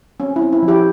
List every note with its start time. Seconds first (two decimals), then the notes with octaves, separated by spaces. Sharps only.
0.20 C4 C#4
0.36 E4
0.42 C4
0.53 E4
0.62 F3
0.68 E4 G4